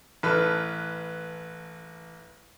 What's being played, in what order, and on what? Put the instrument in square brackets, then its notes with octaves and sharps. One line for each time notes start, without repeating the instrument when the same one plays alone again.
[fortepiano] A1 A4 B4 F6